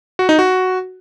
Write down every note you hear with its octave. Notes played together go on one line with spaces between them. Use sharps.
F#4
D#4
F#4